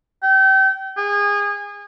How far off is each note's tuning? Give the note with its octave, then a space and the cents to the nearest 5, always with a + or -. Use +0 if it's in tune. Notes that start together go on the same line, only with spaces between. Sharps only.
G5 -30
G#4 -25